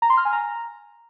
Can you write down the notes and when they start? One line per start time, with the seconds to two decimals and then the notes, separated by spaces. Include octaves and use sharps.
0.02 A#5
0.10 C6
0.17 F6
0.25 G#5
0.33 A#5